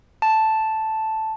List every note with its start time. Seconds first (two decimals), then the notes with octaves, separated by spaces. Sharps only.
0.22 A5